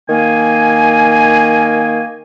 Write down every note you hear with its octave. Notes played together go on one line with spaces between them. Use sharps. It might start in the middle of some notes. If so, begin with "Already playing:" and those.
D#3 A#3 G#5